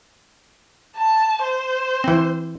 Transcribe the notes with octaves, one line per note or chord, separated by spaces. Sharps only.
A5
C5
E3 C4